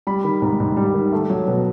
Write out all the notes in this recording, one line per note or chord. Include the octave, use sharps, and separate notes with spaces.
G3 B5
D#3
G#2
G#2
G3
D#3
A3
F#3
B2